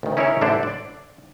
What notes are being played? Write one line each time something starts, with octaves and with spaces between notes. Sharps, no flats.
D2 D#3
C#4 D#4 E4 G#4 A#4 C#5
A1 D3 D4 E4 C5 F#5
D5